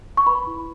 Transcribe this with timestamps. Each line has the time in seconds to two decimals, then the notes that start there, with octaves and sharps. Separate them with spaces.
0.17 C#6
0.27 B4 B5
0.47 E4